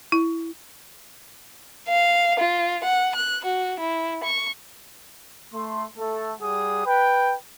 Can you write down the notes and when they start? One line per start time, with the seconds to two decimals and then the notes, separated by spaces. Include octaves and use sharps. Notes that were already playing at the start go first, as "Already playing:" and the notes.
0.12 E4
1.88 F5
2.39 F4
2.84 F#5
3.15 F#6
3.45 F#4
3.79 E4
4.24 C#6
5.53 A3 C6
5.97 A3 A4
6.40 G3 G#4 F#5 D#6
6.85 B4 G5